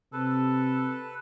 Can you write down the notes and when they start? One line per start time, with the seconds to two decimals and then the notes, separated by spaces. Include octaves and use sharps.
0.13 C3 A4 B4